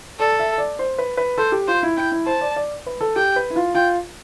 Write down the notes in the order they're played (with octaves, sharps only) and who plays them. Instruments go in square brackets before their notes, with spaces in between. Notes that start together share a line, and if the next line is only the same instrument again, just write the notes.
[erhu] A4 [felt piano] D5
[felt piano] E5
D5
C5
B4
B4
[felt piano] A4 [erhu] C5
[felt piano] G4
[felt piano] F4 [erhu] C5
[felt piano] E4
[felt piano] E4 [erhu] G5
[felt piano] E4
[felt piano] C5 [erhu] A5
[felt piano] D5
D5
B4
A4
[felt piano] G4 [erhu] G5
[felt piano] B4
E4
F4
[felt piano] F4 [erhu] G5